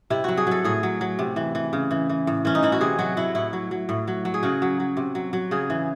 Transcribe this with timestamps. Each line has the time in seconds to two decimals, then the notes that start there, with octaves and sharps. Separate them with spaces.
0.10 C3 E4
0.24 F#3 F#4
0.37 G#4
0.47 F#3 A4
0.64 A2 G#4
0.83 F#3
1.01 F#3
1.19 C3
1.36 E3
1.55 E3
1.73 C#3
1.91 E3
2.09 E3
2.27 A2
2.45 E3 C#4
2.55 D#4
2.63 E3 E4
2.72 F#4
2.81 C3 G#4
2.99 F#3 F#4
3.17 F#3 E4
3.35 A2 E4
3.53 F#3
3.71 F#3
3.89 A2
4.08 F#3
4.25 F#3
4.34 G#4
4.43 C#3 F#4
4.62 F#3
4.80 F#3
4.97 C3
5.15 F#3
5.33 F#3
5.51 C#3 G#4
5.70 E3